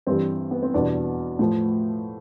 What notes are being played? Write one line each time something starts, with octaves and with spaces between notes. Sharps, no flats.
G2 E3 G3 C4
B3
C4
E2 B2 G3 D4
A2 F3